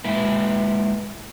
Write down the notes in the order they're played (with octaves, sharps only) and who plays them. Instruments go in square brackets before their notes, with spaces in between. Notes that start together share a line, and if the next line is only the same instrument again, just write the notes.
[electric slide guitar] G#3 A#3 E4 B4